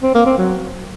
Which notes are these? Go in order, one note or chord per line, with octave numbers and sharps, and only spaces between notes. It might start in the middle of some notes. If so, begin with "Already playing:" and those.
C4
A#3
C4
F#3